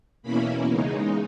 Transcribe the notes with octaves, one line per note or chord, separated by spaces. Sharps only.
E2 B2 A#3 C#4 E4 B5
E2 C#3 G#3 D#4